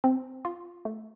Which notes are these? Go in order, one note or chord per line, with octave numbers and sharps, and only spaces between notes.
C4
F4
A3